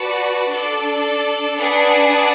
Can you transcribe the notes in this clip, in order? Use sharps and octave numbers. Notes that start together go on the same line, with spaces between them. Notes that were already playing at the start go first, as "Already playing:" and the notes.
Already playing: F#4 B4 D5 F#5 A5
D4 A4 D5
D4 G#4 B4 D5 F#5